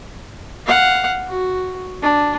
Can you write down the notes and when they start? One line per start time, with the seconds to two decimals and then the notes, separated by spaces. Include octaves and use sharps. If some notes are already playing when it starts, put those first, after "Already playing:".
0.66 F5 F#5
1.28 F#4
2.02 D4